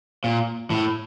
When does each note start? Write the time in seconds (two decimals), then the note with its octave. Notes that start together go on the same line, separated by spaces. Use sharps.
0.24 A#2
0.70 A2